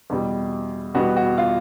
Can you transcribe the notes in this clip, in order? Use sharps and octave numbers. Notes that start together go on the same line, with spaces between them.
E2 B2 G3
E2 B2 G3 B3 F#4
F#4
F4